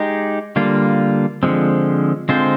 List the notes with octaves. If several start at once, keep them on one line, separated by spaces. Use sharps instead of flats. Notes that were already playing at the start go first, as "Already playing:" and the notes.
Already playing: G#3 D#4 G4
D3 G3 A#3 F4
D3 F3 G#3 C4
D3 G#3 C4 F4 C5